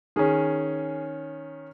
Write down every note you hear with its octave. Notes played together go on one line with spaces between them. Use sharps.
D#3 C#4 G#4